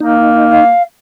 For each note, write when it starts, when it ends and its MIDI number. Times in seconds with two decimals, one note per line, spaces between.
0.01 0.70 58
0.01 0.65 63
0.51 0.82 77